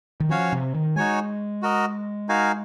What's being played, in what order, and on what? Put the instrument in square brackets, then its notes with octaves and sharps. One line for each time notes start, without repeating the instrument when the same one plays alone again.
[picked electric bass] D#3
[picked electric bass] F3 [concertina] C#4 F#4 C#5 F5
[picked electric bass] C3
D#3
[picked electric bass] G#3 [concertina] D#4 F#4 C#5 G#5
[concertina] F#4 A#4 D#5
D#4 F#4 A#4 F5 G#5